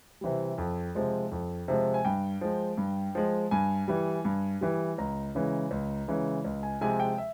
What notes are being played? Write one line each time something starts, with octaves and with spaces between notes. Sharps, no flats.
C3 E3 G3
F2
C3 F3 G#3
F2
C3 F3 G#3
G#5
G2 G5
F3 G#3
G2
F3 G#3
G2 G#5
E3 G3
G2
E3 G3
C#2 A#5
C#3 E3 G#3
C#2
C#3 E3 G#3
C#2
G#5
C3 F3 G#3 G#5
G5
E5